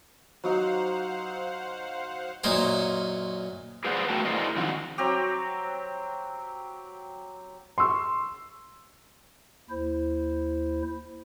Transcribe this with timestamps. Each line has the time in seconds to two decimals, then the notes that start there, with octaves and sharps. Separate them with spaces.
0.44 F#3 D#4 C5 F5 F#5
2.44 F#2 A#2 D#4 C5 C#5 F5
3.85 G#4 B4 C5 D5 F#5
4.09 A3 F#4 A#4 B4 G5 A5
4.25 E4 G#4 A#4 C5 D5 D#5
4.56 D3 D#3 F3 C4 F#4
4.98 F#3 C4 G4
7.78 C6 C#6 E6
9.70 D#2 E4 C5